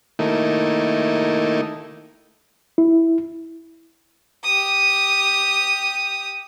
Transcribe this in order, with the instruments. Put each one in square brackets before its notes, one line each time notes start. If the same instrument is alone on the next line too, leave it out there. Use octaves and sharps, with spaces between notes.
[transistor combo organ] D#3 A3 A#3 D#4 E4
[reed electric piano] E4
[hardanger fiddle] G4 D#6